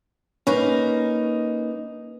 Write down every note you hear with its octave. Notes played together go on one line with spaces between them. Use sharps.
A#3 C#4 D#4 B4